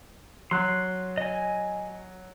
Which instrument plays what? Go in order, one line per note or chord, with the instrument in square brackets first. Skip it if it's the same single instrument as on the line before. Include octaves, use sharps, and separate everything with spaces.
[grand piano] F#3 [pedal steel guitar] C6 F#6
[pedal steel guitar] D#5 G#5